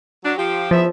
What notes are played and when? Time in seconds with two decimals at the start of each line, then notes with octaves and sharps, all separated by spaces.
0.25 F#3 D4
0.38 F3 G4
0.71 E2 F3 B3 E5